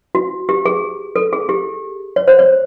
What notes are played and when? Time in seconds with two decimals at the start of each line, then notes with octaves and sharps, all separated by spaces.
0.15 F#4
0.49 G4
0.66 G#4
1.16 A4
1.33 G#4
1.49 G4
2.16 C#5
2.28 C5
2.39 C#5